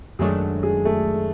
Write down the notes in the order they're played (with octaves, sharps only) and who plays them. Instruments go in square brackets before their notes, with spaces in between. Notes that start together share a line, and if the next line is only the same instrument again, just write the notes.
[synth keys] F#2 D#3 F#3 A3 D4 [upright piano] G#3 G#4
[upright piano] G#3 G#4
A3 A4